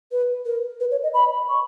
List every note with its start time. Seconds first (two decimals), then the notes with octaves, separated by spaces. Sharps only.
0.12 B4
0.46 A#4
0.80 B4
0.91 C#5
1.03 D#5
1.14 B5
1.49 C#6